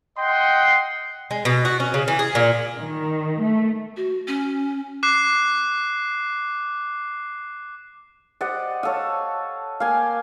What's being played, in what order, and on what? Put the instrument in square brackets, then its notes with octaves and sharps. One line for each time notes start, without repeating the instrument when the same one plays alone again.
[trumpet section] D#5 F#5 G5 C6
[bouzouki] G#3
B2
F#4
C#4
C#3
E3
G#4
A#2
[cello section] D#3
A3
[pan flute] F#4
C#4
[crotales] D6 F#6 C7
[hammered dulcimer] G4 C5 [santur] D5 D#5 F#5
[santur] A4 D#6 [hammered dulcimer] C#5 F5
[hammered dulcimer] A#3 G5 [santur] F5 G#5